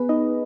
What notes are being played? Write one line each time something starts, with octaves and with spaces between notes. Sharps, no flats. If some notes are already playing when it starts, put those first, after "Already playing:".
Already playing: B3 G#4 B4
D#4 D#5